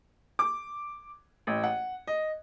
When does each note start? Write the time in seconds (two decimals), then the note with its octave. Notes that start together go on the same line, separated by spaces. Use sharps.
0.39 D6
1.47 A1
1.64 F#5
2.07 D#5